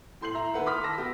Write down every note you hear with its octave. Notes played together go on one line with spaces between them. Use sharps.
A2 A4 C6 G6 C7 F#7
E5 A#5
D#2 A3 B4 F#5
B5 C6 D6 D#6 F6 B6
A5 B5 E6 A#6
B3 F#4 G4